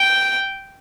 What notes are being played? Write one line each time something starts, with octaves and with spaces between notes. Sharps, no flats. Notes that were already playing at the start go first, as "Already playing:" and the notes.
Already playing: G5